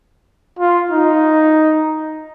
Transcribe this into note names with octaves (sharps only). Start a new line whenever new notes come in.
F4
D#4